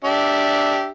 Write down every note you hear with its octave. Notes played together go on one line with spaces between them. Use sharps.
D4 G4 E5